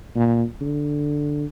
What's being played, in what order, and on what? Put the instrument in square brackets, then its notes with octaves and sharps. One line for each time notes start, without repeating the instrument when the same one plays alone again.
[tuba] A#2
D3